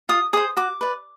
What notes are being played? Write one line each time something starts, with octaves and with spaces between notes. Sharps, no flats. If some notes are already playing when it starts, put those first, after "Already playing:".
F4 D#6
G#4 C5 D#6
F#4 D6
B4 D5